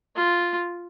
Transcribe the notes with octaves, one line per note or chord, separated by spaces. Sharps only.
F4